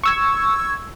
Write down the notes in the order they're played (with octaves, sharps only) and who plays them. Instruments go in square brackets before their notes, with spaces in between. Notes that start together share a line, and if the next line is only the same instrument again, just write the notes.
[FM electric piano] C#6 E6 G#6